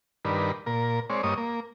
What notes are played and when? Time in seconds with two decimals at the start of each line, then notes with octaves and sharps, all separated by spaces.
0.25 G2 D#3 D4 A#4 B4
0.66 A#2 A#4
1.10 G#3 C4 C#5 D5
1.23 G2 A#3 C#5 D#5 D#6
1.38 A#3